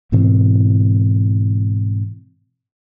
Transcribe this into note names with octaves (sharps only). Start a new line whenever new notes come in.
G#2 B2 E3 C4